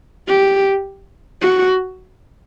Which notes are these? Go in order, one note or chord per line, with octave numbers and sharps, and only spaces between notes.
G4
F#4